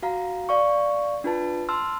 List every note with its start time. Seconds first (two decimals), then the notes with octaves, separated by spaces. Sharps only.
0.03 F#4 F5 A#5
0.49 D5 F5 C#6
1.24 D4 F4 B4 A5
1.69 A5 C6 E6 F6